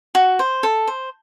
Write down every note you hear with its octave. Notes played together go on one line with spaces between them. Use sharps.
F#4
C5
A4
C5